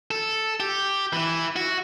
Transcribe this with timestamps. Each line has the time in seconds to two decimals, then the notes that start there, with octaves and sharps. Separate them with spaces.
0.11 A4
0.60 G4
1.13 E3 E4
1.56 F#4